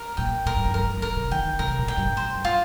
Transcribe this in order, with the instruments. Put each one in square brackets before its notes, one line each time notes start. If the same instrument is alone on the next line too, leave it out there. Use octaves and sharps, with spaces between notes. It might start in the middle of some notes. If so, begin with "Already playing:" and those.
Already playing: [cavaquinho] A#4
[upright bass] A#2 [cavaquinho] G5
[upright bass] A#2 [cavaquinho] A#4
[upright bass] G2
F2
[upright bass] G2 [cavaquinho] A#4
[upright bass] F2
[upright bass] G2 [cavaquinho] A#4
[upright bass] C3
[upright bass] D#3 [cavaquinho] G5
[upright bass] D#3
[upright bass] C3 [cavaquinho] A#4
[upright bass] A#2
[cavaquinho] G5
[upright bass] G2
[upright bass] A#2 [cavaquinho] C5
[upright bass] G2
[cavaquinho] F4